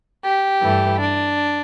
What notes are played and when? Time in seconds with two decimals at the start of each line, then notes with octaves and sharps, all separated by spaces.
0.25 G4
0.62 G2 E3 A3
1.00 D4